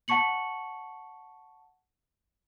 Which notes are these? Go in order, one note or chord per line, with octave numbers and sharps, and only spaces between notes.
F#5 A5 C#6 C#7 F#7